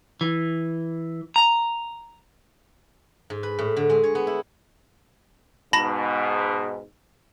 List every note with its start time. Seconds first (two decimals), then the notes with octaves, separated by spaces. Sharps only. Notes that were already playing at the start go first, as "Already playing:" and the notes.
0.21 E3
1.36 A#5
3.30 G#2
3.43 B4
3.59 A2
3.76 D3
3.90 G#3
4.04 C#5
4.15 B3
4.27 E4
5.73 G#2 B2 A5 B5 A#6